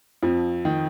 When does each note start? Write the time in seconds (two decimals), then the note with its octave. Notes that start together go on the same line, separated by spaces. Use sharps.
0.23 F2 F3
0.65 D#3